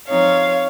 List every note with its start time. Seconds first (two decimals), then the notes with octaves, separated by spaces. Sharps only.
0.09 F3 C4 D#4 C#5 F5